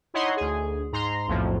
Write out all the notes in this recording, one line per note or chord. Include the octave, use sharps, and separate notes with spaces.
D#4 E4 C#5 D#5 F#5 C6
D2 G#4
G#2 A#5 C6
B1 F2 A2 F3